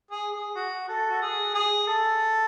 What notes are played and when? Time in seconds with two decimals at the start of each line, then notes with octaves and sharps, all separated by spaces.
0.11 G#4
0.32 G#4
0.55 F#4
0.89 A4
1.09 F#4
1.22 G#4
1.54 G#4
1.87 A4